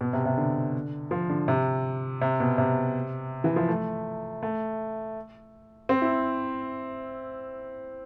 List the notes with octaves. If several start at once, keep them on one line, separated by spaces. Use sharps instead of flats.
B2
C3
C3
D3
F3
D3
C3
C3
B2
C3
E3
F3
A3
A3
C4
E4